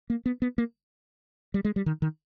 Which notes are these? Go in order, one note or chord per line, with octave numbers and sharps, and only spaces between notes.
A#3
B3
B3
A#3
G3
G#3
G3
D#3
D#3